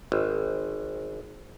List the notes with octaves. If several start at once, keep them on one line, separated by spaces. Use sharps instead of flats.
G#1